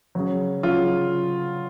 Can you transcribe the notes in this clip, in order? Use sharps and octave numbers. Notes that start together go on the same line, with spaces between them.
C#3 F#3
C#3 F#3 F4